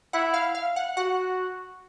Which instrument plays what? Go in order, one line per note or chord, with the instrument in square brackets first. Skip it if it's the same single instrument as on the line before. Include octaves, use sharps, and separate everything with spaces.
[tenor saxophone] E4 [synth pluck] F#5
[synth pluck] F5
F5
F#5
[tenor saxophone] F#4 [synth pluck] F#5